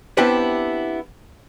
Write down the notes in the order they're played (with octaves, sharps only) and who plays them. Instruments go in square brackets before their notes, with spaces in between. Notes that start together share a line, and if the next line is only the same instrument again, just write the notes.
[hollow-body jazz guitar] B3 C4 D4 E4 G4 C5